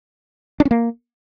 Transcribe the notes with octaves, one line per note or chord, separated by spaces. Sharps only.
D4
C#4
A#3